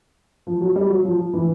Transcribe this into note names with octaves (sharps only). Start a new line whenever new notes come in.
F3
F#3
G3
F#3
F3
E3